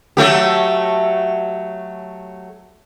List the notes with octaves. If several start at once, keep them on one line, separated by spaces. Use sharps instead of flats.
F#3 A3 G4